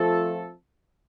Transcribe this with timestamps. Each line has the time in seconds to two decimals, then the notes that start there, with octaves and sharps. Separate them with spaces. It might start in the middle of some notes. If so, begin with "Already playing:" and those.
Already playing: F3 A3 C4 F4 A4